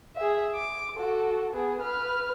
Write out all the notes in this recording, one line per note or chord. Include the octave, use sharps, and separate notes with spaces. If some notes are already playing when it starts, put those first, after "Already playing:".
G#4 E5
D6
F#4 A4
B3 G#4
B4 F6